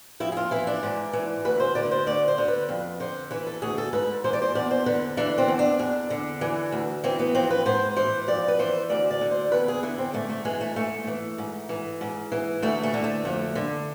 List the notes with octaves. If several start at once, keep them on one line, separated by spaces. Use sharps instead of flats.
F2 E4
G#4
F4
E3 E4
D4
G#2
E3
D2 B4
C5
D3 D5
B4
C5
D2 D5
C5
D3
B4
F2
D3 C5
E3 B4
A4
D2 G#4
A4
G#2 B4
E3 C5
D5
C5
E2 D5
C5
D3 B4
E3 D4
C4
E2
D4
E2
D3
E3
D2
E3 C4
B3
F2 C4
B4
G#2 C5
E3 C5
F2 D5
B4
E3 C5
D2 D5
D5
D3
C5
E2 B4
G#4
D3 E4
C4
G#2 A3
A3
E3 G#3
A3
G#2 A3
E3
G#2
E3
G#2
E3
D2 A3
A3
D3
A3
F2
D3